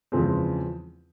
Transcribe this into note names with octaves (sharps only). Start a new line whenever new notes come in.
E2 C#3 F3 G#3 C4